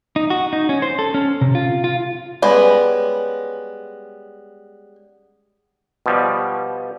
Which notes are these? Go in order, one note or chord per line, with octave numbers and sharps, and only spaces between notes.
D#4
F#4
D#4
C#4
C5
A4
C#4
C3
F4
F4
G3 G#3 B3 C#4
B2 F3 G3